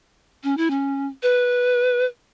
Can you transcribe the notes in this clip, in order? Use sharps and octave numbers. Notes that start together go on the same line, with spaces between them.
C#4
E4
C#4
B4